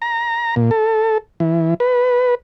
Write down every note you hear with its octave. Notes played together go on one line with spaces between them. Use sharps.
A#5
A#2
A4
E3
B4